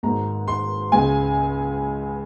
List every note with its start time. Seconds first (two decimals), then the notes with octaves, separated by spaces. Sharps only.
0.03 G#1 G#2 D#3 A#5
0.48 C6
0.92 C#2 C#3 G#5